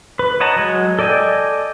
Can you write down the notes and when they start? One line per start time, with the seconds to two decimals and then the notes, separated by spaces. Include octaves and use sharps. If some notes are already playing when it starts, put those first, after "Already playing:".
0.19 B4
0.40 C#5 D#5 F#5 A5 A#5
0.56 F#3 G#3
0.99 A4 D5 D#5 G5 G#5